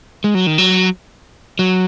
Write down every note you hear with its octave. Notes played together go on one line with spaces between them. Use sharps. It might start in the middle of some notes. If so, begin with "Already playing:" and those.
G#3
F#3
D#3
F#3
F#3